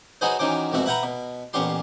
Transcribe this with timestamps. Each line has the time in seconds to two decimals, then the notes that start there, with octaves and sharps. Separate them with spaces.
0.21 F#3 D#4 F#4 G#4 B4 C5
0.39 D#3 E3 F#3 C#4 C5 D6
0.72 C2 F2 G#2 B2 F#4 E5
0.86 B4 E5 F#5 G5 A#5 B5
1.03 B2
1.53 A1 A#2 B3 C#4 G4 C6